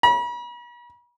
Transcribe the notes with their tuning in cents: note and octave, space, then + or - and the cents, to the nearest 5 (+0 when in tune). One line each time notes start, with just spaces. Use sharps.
B5 -45